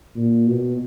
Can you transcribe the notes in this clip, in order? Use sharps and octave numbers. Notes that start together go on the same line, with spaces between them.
A#2
B2